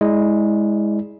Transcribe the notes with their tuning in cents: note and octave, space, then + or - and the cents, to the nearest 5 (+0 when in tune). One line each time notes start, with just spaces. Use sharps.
G#3 +0 E4 -30 D5 -5